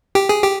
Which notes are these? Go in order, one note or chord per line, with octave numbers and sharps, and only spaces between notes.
G4
G#4
G4